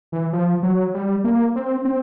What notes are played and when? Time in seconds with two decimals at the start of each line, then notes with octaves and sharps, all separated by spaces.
0.12 E3
0.33 F3
0.63 F#3
0.94 G3
1.24 A#3
1.55 C4
1.85 C4